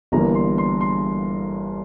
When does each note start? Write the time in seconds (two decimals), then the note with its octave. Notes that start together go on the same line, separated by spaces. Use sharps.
0.12 G1 G2 E3 A#3 A#5
0.35 C6
0.58 C6
0.81 C6